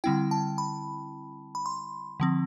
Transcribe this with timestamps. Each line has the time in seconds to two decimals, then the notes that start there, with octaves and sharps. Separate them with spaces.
0.04 D3 G3 C4 E4 G5
0.31 A5
0.58 B5
1.55 B5
1.66 C6
2.20 D3 F3 C4